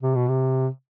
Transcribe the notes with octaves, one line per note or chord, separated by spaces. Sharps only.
C3
B2
C3